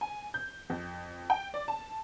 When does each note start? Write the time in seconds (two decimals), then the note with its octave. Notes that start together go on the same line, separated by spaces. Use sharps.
0.01 G#5
0.34 G6
0.70 F2
1.30 G5
1.54 D5
1.68 A5